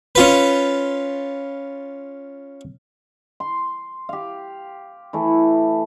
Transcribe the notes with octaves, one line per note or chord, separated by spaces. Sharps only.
C#4 F4 B4
C6
G4 F5
E3 A3